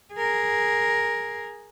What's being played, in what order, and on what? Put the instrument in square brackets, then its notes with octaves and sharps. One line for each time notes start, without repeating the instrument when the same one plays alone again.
[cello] G#4 A#4